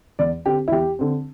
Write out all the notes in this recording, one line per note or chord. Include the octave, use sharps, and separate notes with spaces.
E2 D5
D3 C4 G4
E4
E2 G4
D3 C4